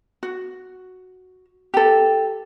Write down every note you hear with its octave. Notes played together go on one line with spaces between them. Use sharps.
F#4
G4 A4